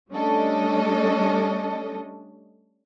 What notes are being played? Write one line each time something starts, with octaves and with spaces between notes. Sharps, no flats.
G3 A3 C#4 D4 A4 D#5